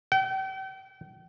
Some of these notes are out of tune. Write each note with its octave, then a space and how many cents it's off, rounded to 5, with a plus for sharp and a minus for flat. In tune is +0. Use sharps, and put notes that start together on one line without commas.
G5 -40